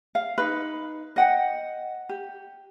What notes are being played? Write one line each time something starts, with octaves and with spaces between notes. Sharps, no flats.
F5
D#4 B4
D#5 F#5 G5
G4